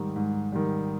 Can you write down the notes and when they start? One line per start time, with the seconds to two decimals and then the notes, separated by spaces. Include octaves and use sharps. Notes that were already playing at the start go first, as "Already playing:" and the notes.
Already playing: G#2 D#3 G3
0.16 G#2
0.52 D#3 G3